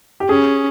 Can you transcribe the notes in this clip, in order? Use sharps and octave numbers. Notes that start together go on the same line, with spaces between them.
G4
C#4 G#4